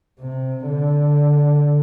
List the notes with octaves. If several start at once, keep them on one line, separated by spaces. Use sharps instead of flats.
C3
D3